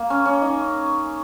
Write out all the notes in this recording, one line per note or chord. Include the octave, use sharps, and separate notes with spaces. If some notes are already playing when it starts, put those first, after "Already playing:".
Already playing: A#3
C#4
C#4
D#4